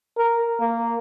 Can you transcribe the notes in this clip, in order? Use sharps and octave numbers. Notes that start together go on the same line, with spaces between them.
A#4
A#3